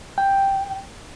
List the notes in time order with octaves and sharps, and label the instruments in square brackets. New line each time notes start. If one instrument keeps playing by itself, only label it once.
[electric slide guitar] G5